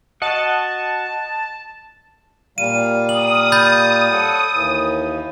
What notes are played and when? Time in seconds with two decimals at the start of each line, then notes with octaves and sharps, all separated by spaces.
0.22 F#4 D#5 F#5 A5
2.58 A#2 G3 F5 D#7
3.09 D#6 F#7
3.52 B5 G6 A6
4.12 A4 C#5 F#5
4.54 D#2 E3